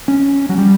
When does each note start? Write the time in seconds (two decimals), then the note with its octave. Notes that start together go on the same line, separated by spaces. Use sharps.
0.08 C#4
0.49 F#3
0.58 G3